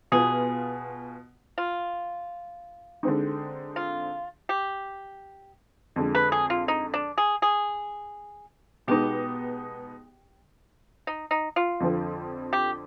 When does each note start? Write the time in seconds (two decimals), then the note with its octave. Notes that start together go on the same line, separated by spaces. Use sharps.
0.12 B2 B3 F4 G#4
1.58 F4
3.03 D3 G#3 C4 D#4
3.76 F4
4.49 G4
5.96 F2 D3 G#3
6.15 B4
6.32 G#4
6.50 F4
6.68 D#4
6.94 D4
7.18 G#4
7.42 G#4
8.88 B2 G#3 B3 D#4 G4
11.07 D#4
11.31 D#4
11.56 F4
11.80 F2 D3 F3 C4
12.53 G4